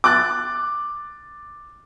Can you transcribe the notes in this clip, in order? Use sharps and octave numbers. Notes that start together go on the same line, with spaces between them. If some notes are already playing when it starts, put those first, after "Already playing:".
D6 F#6 A6